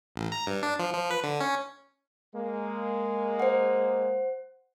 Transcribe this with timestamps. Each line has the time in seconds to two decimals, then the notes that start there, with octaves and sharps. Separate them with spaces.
0.16 A1
0.32 A#5
0.47 G2
0.63 D4
0.79 F3
0.94 F3
1.11 B4
1.23 D3
1.41 C#4
2.35 G#3 A#3
3.40 C5 F#5